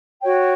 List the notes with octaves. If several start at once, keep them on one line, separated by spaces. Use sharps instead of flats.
F#4 C#5 G5